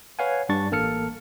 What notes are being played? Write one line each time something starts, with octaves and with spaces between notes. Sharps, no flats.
B4 C#5 F5 F#5 G#5
G2 G3 D4 C#6 A6
A1 A#3 A4 A5 F6 C#7